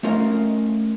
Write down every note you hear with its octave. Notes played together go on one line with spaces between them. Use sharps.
A3 C#4 F4 A#4 D#5 F5